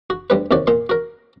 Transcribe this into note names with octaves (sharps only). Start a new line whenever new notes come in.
F#4
D2 G3 B4
D#2 C3 F#4 D5
A#2 C6
F#4 A#4